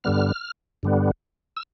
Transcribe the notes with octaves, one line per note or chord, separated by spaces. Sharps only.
G2 D3 G3 B3 F6
G2 D3 G3 B3
E6